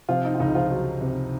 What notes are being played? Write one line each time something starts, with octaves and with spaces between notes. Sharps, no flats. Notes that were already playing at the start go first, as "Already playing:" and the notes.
C3 F3 F4
D#4
F4
C#2 D#4
F3 F4
F#3
C3